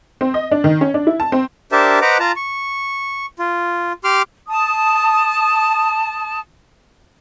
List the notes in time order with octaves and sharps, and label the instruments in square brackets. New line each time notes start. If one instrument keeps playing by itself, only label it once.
[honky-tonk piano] C4
D#5
D4
D#3
C#4
D4
E4
A5
C4
[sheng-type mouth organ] D4 G4 A#4 C5 E5 A5
B4 C5 D#5 F#5 A#5 D6
F4 A5 A#5
C#6
F4
G4 C6 D6 F6
[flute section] A5 D#6